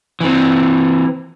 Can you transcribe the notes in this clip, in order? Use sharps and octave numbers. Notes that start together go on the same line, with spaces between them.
E3 C4